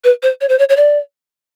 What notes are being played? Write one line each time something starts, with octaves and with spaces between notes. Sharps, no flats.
B4
C5
C#5
C5
C#5
C#5
D5